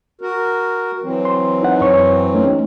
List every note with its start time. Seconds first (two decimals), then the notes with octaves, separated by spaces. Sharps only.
0.21 F#4 A#4
1.03 E3 F#3 C4
1.25 C6
1.63 D#4 F#5
1.81 F#2 C#5 C#6
2.34 A3 C#4 D#4